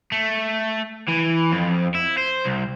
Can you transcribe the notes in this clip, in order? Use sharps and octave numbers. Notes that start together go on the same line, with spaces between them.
A3
E3
F2
E4
C5
C2